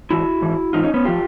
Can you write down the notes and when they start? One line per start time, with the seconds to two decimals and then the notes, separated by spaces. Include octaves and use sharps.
0.10 G#2 E3 E4 F#4
0.41 G#2 E3
0.73 G#2 E3 D#4 F4
0.83 C#4 D#4
0.94 B3 C#4
1.05 F3 F4 G4